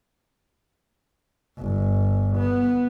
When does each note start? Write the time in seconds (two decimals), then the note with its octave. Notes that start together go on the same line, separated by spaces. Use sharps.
1.59 G1
2.38 B3